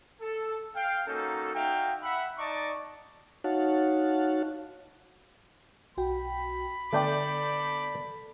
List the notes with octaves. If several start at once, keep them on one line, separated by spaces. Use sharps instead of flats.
A4
F5 G5
A#3 C#4 D#4 F#4 A4
D#4 F#4 E5 F5 G5
E5 F#5 B5
D#4 D5 D#5 A5 C#6 D6
D#4 F#4 C#5 F5 F#5 A5
B1 F#4 G5 B5
D3 A3 B3 D4 A4 D5 G5 G6